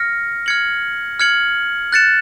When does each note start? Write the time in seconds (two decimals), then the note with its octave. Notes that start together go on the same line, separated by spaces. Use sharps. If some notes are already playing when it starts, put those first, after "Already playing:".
Already playing: F6 A#6 C#7
0.46 F6 G#6 C#7 F#7
1.20 F6 G#6 C#7 F#7
1.92 F#6 A6 C#7 E7